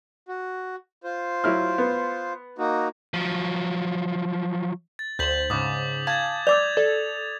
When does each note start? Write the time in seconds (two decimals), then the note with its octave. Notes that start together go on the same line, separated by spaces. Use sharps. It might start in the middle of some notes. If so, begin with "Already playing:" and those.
0.28 F#4
1.04 F4 C5
1.44 F#3 E4 F6
1.78 B3
2.58 A#3 D#4 F#4
3.14 F3 F#3
4.99 A6
5.19 D2 C5 G6 B6 F#7
5.50 G#2 C#3 D6 D#6
6.07 F5 G#5 A5 G#6 A6
6.47 D5 D6 E6 G6 A6 F7
6.77 A4 D5